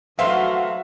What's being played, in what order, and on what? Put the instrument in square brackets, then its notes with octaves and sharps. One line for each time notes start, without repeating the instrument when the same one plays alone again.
[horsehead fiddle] F#3 F#4 [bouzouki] A3 B4 C5 [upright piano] E5 C6 [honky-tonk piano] F5